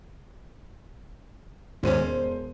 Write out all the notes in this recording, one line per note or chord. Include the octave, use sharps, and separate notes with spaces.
E1 D#2 G#2 C#4 C5 D#7